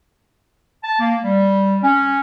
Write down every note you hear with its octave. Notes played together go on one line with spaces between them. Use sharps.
A5
A#3
G3
C#4